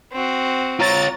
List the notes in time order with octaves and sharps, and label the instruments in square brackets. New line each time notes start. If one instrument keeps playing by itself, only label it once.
[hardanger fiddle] C4 F#4
[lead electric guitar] F4 C#5 [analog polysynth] A#5 A6